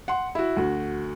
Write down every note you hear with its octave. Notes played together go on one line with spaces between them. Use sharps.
F#5 C6
E4 F#4
D2 F#4